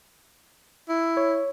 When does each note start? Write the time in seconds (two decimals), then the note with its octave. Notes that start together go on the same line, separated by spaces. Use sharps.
0.89 E4
1.17 C#5